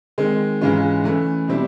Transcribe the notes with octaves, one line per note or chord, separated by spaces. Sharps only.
D#3 G#3 C4
G#2 E3 G#3 C#4 F4
E3 A3 C#4
B2 G3 C4 E4